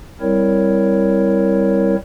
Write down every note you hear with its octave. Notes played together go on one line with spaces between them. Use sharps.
G3 C4 E4 A#4 C#5